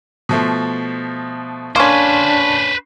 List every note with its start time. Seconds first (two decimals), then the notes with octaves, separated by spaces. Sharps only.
0.29 B2 F3 A3
1.76 A#3 C#4 D4 B4 C5 C6 C#6